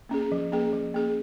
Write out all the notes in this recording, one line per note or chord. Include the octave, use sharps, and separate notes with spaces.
A#3 C#4 G#4
F3
A#3 C#4 G#4
F3
A#3 C#4 G#4